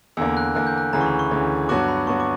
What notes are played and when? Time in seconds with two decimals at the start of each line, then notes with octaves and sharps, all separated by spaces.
0.17 E2 D3 A#3 E6
0.37 F#6
0.55 E2 D3 A#3 F#6
0.67 G6
0.78 F#6
0.93 D2 C#3 E3 A#5
1.01 C#6
1.06 B5
1.19 C#6
1.31 D2 C#3 E3
1.69 G2 F#3 B3 F#4 D6
1.88 B5
2.07 G2 F#3 B3 F#4 C#6
2.20 D6